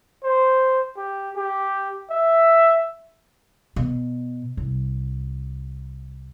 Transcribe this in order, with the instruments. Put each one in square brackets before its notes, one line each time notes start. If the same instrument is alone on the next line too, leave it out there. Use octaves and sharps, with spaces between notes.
[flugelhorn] C5
G4
G4
E5
[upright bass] B2
C2